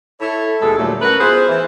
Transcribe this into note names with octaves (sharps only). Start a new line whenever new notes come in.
E4 A4 C#5
D#2 B2 G#3 G#4 A4
A#2 D3 F#3 G3 A3
C#4 F#4 A#4 B4
B3 E4 F4 G#4 B4 C5
E3